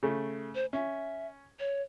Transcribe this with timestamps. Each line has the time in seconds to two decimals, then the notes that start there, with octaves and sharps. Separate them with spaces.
0.03 C#3 A3
0.55 C5
0.73 C#4 E5
1.59 C#5